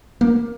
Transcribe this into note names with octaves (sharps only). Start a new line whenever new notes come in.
A#3